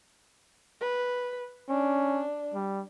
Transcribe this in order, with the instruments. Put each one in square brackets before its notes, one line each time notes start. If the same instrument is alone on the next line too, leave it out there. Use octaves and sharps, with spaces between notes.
[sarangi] B4
[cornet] C#4 [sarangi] D4
[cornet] G3